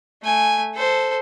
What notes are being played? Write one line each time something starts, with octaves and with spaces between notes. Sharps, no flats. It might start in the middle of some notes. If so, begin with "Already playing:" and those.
A3 G#5
A4 C5